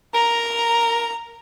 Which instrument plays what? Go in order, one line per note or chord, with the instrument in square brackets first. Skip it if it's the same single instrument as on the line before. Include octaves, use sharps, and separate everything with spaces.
[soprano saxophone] A#4 [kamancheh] A#5